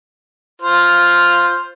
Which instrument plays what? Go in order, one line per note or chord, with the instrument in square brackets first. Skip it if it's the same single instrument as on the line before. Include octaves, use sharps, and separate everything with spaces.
[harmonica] F4 C5 F6